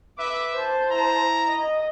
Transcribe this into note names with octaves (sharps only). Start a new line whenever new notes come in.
B4 E5 D6
C5 A5
E4 A#5
D#5